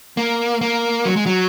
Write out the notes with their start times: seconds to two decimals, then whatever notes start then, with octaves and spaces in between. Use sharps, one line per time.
0.17 A#3
0.61 A#3
1.05 F#3
1.16 G#3
1.26 F#3